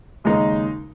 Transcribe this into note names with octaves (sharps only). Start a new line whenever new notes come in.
D#2 C#3 G#3 D#4